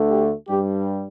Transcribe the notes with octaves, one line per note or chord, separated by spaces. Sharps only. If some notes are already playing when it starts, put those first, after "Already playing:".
Already playing: D2 D3 A3
G4
G2 G3 G4